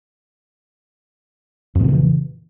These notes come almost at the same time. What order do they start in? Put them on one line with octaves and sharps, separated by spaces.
F2 A#2 C#3 E3